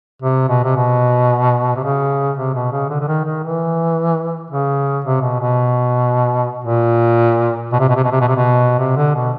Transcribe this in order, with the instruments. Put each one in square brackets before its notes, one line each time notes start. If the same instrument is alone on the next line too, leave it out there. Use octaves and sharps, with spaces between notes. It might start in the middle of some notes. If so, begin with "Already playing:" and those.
[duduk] C3
B2
C3
B2
C3
C#3
C3
B2
C#3
D3
D3
D#3
D#3
E3
C#3
C3
B2
B2
A#2
B2
C3
B2
C3
B2
C3
B2
C3
B2
C3
D3
B2